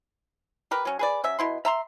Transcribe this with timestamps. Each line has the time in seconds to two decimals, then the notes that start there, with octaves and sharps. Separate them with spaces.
0.71 G4 A#4 B4
0.85 F#3 C#4
0.99 G#4 B4 D5
1.24 F#3 C#4 E5
1.39 B2 E4 C6
1.65 E5 A#5 C6